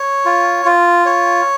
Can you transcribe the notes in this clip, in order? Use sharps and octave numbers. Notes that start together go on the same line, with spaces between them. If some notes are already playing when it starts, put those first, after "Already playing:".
Already playing: C#5
F4
F4
C#5